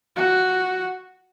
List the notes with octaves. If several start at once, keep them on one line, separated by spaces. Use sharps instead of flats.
F#4